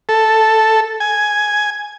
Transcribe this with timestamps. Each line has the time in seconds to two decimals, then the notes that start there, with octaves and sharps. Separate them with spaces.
0.09 A4
1.00 G#5